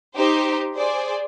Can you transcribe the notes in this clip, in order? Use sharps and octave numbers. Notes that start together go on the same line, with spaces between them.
D#4 G4 C5
G#4 C5 D5